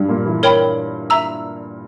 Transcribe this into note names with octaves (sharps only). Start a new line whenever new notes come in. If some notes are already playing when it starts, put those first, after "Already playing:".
Already playing: G2 G3
A#2 A#3
E3 E4
A#4 C#5 G5 B5
E5 A#5 E6